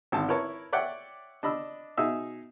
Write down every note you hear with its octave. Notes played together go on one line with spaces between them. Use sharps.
G#1 D3 A5
E4 A#4 B4 C#5 A5
C#5 D5 E5 F#5 G5
D4 D#5 B5 E6
B2 D#4 G#4 E5 E6